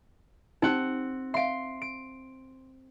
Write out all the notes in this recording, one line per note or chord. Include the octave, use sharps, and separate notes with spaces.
C4 D#4 G4 F#5
E5 F5 C6 D7
D7